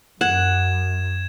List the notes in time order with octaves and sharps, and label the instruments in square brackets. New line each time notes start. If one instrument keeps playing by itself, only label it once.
[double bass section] F#2 [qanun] F#5 [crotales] G#6 E7